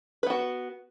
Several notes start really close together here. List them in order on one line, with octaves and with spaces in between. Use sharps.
B4 B3 F#4